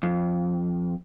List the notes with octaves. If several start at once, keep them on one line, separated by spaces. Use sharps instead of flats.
F2